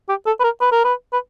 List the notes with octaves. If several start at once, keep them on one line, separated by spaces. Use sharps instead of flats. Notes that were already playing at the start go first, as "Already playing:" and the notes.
G4
A4
B4
A#4
B4
A#4
B4
B4